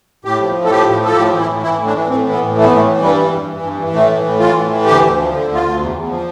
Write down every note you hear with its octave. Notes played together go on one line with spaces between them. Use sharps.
A2 G4
F3
A2
A4
F3 G4
A2
F3 A4
A2 G4
E3
E4
A2
E3 E4
A2
D4
E3
A2 C4
E3
B3
A2
E3 A3
B3
A2 A3
E3
G2 G3
E3
G2
E3
G2
E3
A2 A3
E3
A2
E3 F4
A2
E3
D2 G4
D2
F3
D3
D2
F4
D2
E2
E2
F3